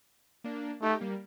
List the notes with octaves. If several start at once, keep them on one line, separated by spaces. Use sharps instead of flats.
A#3 D4
A3 D#4 G4
G3 A#3